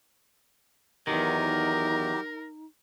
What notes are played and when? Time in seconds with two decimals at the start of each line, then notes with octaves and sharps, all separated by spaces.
1.07 E2 D#3 F#3 D#4 G4 A#4